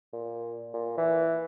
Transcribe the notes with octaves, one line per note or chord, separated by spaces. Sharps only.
A#2
A#2
E3